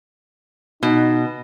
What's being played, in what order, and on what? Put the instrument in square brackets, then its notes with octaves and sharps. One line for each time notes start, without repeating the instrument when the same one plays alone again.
[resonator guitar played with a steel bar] B2 [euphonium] D#4